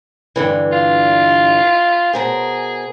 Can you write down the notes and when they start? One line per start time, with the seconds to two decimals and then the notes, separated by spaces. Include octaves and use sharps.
0.36 G2 D3 E3
0.72 F4
2.13 B2 G#4 A#4 C5